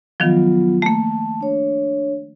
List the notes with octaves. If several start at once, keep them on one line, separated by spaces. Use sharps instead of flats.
D#3 F3 F#3 B3 F4
A3 A#3 A5
D4 C#5